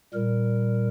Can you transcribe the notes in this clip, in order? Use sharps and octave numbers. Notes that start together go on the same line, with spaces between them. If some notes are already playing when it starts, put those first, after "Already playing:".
A#2 G3 A#4